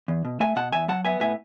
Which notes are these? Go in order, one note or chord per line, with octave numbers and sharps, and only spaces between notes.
E2
B2
A3 E5 G#5
B2 F#5 A5
E2 E5 G#5
F#3 F#5 A5
B3 E5 G#5
A2 E5 G#5